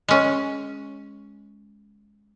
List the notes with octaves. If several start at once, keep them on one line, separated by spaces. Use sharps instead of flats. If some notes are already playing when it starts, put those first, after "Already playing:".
G#3 C#4